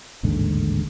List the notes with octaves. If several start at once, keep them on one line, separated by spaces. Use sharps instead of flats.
A1 D#2 G#2 D3